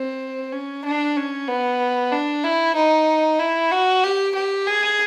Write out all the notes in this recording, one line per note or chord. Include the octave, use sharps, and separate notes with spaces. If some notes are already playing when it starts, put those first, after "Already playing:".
Already playing: C4
C#4
D4
C#4
B3
D4
E4
D#4
E4
F#4
G4
G4
G#4